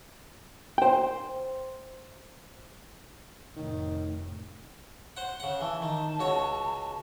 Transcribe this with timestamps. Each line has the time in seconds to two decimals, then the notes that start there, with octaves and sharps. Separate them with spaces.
0.78 C5 G5
3.56 F1 A2 D#3
5.17 C5 F#5
5.40 C#3 F#5
5.61 E3 A5
5.82 D#3
6.20 C#2 F#4 C#5